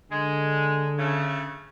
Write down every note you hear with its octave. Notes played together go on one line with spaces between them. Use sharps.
D3 G#3
C#3 A3